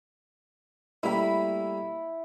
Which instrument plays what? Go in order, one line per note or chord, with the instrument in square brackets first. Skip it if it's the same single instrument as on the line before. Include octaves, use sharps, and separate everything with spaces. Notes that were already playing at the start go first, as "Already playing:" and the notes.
[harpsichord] G3 A3 A#3 [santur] E4 B5